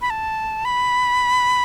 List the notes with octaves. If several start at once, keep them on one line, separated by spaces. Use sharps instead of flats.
B5
A5
B5